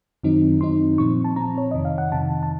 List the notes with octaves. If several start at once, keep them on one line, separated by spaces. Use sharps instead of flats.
F#2 D#3 F#3 C4 D#4
F#2 D#3 F#3 C4 D#4 C6
A#2 F3 C4 C#6
A5
A#2 F3 C4 A#5
C#5
F2 C3 D#3 D#5
F5
F#5
F2 C3 D#3 A5
A5